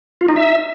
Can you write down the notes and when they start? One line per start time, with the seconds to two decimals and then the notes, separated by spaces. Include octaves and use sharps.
0.21 F4
0.29 D#4
0.36 E5